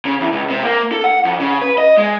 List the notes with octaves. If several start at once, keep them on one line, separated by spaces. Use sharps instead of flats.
C#3
E2
C#2
C3
A#3
A4
F#5
F2
C#3
B4
D#5
G#3